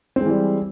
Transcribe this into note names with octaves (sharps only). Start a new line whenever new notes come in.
E3 G3 G#3 C4